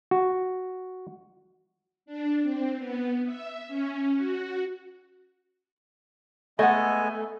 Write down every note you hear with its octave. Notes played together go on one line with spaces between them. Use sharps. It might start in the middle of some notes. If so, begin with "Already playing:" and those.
F#4
D4
C4
B3
E5
C#4
F#4
G#3 A3 B3 D#5 F#5 G#5